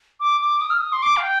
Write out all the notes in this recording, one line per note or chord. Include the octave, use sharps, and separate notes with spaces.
D6
D6
D#6
F6
D#6
C6
D6
F5
G5